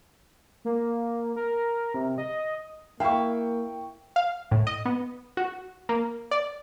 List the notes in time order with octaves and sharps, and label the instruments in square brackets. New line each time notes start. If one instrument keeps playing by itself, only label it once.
[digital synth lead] A#3
A#4
C3
D#5
[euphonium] A#3 [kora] E4 E5 F5 [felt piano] G5 C#6
[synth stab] F5
A2
D#5
B3
F#4
A#3
D5